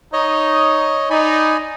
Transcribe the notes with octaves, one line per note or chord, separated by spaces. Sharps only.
D#4 C#5 D#5
D#4 D5 G#5 B5